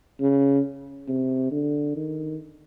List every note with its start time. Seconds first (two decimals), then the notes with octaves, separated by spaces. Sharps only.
0.20 C#3
1.08 C3
1.52 D3
1.96 D#3